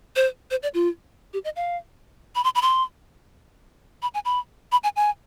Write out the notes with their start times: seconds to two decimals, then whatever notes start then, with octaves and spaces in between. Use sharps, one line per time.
0.16 C5
0.51 C5
0.63 D5
0.74 F4
1.33 G4
1.44 D#5
1.56 F5
2.35 B5
2.44 C6
2.55 B5
2.62 C6
4.02 B5
4.14 G#5
4.25 B5
4.72 B5
4.84 G#5
4.96 G#5